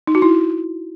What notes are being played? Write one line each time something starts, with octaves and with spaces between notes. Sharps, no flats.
D#4
F#4
E4